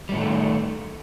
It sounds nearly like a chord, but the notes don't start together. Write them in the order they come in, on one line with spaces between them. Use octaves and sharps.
G3 A2 D#3 A3